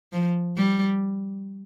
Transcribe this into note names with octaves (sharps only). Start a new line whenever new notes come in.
F3
G3